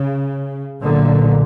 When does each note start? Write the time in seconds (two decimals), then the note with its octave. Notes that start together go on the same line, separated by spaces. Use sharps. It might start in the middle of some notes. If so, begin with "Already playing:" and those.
Already playing: C#3
0.81 B1 A#2 D3